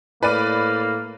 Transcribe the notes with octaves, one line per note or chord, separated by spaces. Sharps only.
A2 A#3 B4 D5 D#7